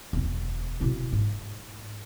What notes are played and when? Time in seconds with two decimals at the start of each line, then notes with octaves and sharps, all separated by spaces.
0.13 E1 D2
0.81 B2 E4
1.13 G#2